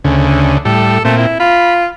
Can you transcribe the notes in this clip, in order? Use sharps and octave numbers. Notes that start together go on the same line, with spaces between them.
D2 C#3
D3
A2 G3 A4
A#2 A3 C4
E4
F4 B5